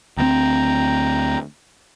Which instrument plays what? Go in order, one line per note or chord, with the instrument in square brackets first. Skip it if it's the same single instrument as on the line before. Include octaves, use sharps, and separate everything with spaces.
[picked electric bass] D2 B3 C4 [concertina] G5 A#5